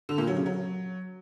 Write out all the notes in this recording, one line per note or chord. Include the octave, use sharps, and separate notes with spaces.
D3
A#2
F#3
C#3
F#3